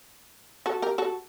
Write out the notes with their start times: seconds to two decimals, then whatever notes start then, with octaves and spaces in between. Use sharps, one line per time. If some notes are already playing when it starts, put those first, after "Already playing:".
0.66 F#4 A4
0.82 G4 A#4
0.98 F#4 A4